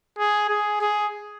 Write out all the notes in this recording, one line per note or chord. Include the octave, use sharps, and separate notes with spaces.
G#4
G#4
G#4